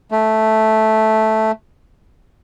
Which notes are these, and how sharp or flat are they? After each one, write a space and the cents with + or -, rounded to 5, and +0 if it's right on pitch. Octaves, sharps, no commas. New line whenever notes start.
A3 -5